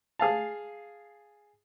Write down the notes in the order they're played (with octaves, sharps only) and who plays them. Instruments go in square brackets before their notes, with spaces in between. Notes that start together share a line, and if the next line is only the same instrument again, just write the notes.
[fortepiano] G#4 F5 A5